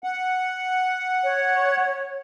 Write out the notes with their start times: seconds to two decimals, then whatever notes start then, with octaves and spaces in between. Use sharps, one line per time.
0.04 F#5
1.23 C#5